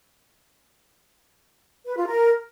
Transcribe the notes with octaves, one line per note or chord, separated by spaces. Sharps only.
B4
F4
A#4